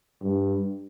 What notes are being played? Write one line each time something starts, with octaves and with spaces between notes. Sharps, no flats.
G2